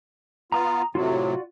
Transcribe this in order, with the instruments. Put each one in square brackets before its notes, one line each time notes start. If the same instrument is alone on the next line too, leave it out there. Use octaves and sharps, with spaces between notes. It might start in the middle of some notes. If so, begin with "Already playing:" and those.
[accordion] B3 F4 [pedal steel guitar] A#5 D#6
[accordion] A2 C3 F#3 [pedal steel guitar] F4 F#4 D5